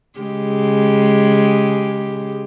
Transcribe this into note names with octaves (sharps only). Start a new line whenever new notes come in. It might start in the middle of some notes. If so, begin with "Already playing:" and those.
C#3 G#3 G4